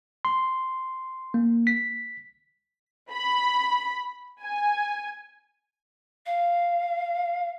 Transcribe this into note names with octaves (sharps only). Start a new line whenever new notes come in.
C6
A#3
B6
B5
G#5
F5